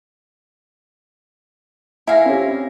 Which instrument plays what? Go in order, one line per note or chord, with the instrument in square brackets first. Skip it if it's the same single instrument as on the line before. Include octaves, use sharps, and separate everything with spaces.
[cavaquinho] E4 F5 [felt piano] G#5 A#6
[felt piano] C4 C#4 G4